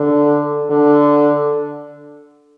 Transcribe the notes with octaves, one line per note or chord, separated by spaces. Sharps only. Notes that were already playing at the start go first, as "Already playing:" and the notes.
Already playing: D3
D3